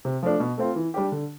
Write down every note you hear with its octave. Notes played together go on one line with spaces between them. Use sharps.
C3
F3 A3 D4
B2
A3 C4 F4
E3
G3 D4 G4
D3